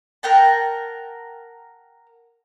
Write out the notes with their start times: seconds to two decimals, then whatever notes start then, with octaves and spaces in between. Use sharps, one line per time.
0.23 A#4 F#5 G5 A5